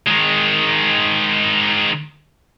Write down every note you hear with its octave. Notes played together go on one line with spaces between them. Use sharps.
D#3 G#3